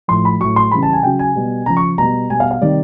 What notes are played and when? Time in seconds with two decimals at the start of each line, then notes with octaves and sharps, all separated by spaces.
0.08 A2 F3 C6
0.25 B5
0.40 A2 F#3 C#6
0.56 C6
0.71 C#3 E3 G3 B5
0.83 A5
0.93 G#5
1.03 C#3 F#3 G5
1.19 G#5
1.36 B2 G3
1.66 C#3 F3 A#5
1.77 C#6
1.98 B2 G3 A#5
2.30 B2 G3 G#5
2.40 F5
2.51 F5
2.61 C3 D#3 G3 D5